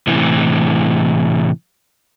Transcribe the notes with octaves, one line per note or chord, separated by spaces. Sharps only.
A2 C3 E3